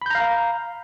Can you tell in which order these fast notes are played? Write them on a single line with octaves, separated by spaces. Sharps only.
B5 G6 A#5 F5